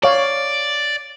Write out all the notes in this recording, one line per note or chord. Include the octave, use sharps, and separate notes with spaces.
C#5 D5 F5